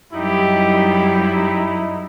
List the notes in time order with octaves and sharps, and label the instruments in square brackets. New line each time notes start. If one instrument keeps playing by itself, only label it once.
[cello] F#2 G3 [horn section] D#4 E4 [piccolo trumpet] G4